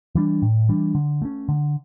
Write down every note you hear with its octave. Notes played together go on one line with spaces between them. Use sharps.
E3 G3 D4
A2
E3 G3 D4
D3
A3 C#4
D3